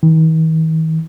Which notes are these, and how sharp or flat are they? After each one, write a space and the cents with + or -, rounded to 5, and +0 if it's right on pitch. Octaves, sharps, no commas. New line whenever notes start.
D#3 +45